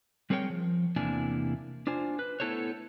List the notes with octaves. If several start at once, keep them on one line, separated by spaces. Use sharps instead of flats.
G3 C4 G#4 A#4 C#5 G5
F3
E2 C3 A#3 D4 E4 G#5
D4 F4 C5 G#5
B4
A3 B3 E4 A4 C5 C#5